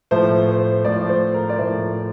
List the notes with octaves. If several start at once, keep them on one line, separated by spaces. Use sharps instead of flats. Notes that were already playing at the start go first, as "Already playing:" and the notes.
A2 F3 A3 C5
C5
A2 F3 A3 D5
C5
A#4
D5
A2 F3 A3 C5